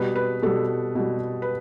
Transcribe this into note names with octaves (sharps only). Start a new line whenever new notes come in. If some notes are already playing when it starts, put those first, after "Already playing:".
Already playing: B2 G3 B4
B4
B2 G3 A4
B2 G3
B4